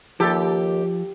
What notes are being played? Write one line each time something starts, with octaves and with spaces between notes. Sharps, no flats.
D#2 F3 G4 A4